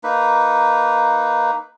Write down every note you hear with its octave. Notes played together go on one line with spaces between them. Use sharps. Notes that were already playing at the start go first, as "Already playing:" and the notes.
A#3 D#4 B4